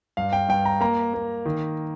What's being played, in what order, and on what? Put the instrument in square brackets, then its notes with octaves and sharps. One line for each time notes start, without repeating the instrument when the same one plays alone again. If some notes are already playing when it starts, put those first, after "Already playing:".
[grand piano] G2 F5
G5
G2 G5
A#5
A#3 A#5
A#3
D#3